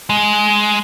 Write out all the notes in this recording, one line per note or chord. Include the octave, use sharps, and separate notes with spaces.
G#3